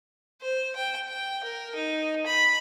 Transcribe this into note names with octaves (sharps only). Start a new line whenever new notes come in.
C5
G5
G5
A#4
D#4
B5